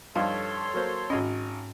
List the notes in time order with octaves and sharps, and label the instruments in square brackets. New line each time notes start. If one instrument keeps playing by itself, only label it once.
[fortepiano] G2 F3 D#4 [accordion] A4 C#5 C6 [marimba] F5
[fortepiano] F#3 A#3 C5
[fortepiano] G#1 D#5 [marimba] G#2 C#4